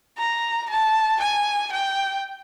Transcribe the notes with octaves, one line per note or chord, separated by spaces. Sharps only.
A#5
A5
G#5
G5